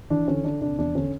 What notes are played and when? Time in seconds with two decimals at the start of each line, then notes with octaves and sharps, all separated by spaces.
0.10 E3 D4
0.28 D3 C#4
0.44 D3 D4
0.61 C3 D4
0.78 E2 D4
0.95 D3 C#4